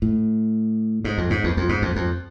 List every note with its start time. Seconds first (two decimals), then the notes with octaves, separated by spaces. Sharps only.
0.02 A2
1.04 G#2
1.18 F2
1.30 G#2
1.44 E2
1.57 F2
1.69 G#2
1.82 F2
1.96 F2